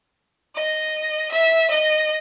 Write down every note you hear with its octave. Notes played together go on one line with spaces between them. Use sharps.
D#5
E5
D#5